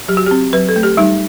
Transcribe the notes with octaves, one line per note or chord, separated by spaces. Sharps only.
F#3 G4
F#4
C4 G4
F#3 B4
A4
A3
G4
G3 D#4